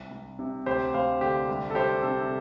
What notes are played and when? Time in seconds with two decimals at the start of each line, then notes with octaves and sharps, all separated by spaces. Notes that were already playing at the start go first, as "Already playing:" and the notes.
Already playing: C2
0.11 C2
0.39 C3
0.66 D2 G4 C5
0.94 D2 C5 F5
1.21 D3 G4
1.49 C2
1.70 A4
1.75 C2 G4 C5
2.03 C3 A4